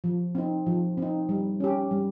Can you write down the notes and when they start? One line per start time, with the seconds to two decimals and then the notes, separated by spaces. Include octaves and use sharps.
0.04 F3
0.35 C4 D#4
0.66 F3
0.98 C4 D#4
1.29 G3
1.60 C#4 G4
1.91 G3